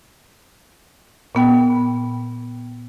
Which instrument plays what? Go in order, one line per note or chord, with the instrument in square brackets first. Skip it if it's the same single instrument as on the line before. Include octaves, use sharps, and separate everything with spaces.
[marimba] A#2 B3 G5